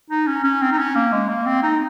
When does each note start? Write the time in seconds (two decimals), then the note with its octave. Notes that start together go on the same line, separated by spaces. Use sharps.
0.10 D#4
0.27 C#4
0.44 C#4
0.61 C4
0.72 D#4
0.78 C#4
0.95 A#3
1.12 G#3
1.29 A#3
1.46 C4
1.63 D#4